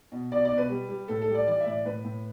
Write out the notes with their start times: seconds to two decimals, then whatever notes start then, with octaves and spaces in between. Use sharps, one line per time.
0.12 B2
0.32 B2 D5
0.45 D5
0.52 B2
0.58 B4
0.70 G3
0.89 G3
1.08 A2 A4
1.21 A4
1.28 G3
1.35 D5
1.47 E3 D5
1.60 E5
1.66 A2 D5
1.85 A2 B4
2.04 A2